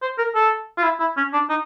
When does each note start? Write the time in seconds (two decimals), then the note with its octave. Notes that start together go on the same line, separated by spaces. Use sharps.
0.02 C5
0.18 A#4
0.35 A4
0.77 F4
0.83 E4
1.00 E4
1.17 C#4
1.33 D4
1.50 D#4